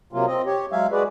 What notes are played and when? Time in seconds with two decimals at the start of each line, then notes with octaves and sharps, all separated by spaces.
0.13 C3 F#3 A#3 F4
0.26 C4 D#5
0.46 G4 C#5
0.72 F#3 G#3 E5 F5 G#5
0.92 G#3 F#4 G#4 B4 D5